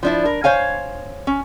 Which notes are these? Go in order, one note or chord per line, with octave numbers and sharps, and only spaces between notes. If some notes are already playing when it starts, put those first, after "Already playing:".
F3 D4 E4
A#4
C5 C#5 F5 G#5
C#4